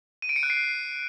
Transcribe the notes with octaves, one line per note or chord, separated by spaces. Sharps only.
D#7
D7
C#7
F#6
C7